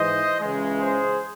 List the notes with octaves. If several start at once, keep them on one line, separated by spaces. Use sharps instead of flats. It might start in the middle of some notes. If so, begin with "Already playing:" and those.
Already playing: G#2 E3 C5 D#5
C#2 C#3 E3 G#3
G#4 C5